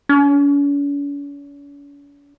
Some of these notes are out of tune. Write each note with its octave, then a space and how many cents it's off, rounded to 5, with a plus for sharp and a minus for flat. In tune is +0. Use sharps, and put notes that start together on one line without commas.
C#4 +45